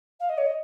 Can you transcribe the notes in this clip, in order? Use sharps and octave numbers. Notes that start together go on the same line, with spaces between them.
F5
D#5
C#5
D#5